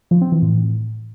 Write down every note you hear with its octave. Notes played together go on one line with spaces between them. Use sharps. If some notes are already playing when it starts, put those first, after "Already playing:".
F3
C4
E3
A2